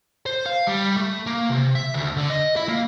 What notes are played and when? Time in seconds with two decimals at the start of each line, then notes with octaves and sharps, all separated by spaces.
0.26 C5
0.46 F5
0.67 G3
0.97 A3
1.27 A#3
1.50 C3
1.75 E5
1.94 D2
2.17 D3
2.30 D#5
2.56 E4
2.69 A#3